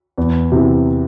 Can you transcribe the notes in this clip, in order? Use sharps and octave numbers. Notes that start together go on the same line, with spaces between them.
E2
C3 E3